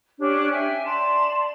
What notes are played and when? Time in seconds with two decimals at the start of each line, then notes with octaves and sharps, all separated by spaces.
0.19 C#4 D4 G4 C#5
0.52 E5 G5 G#5
0.84 D5 A5 C6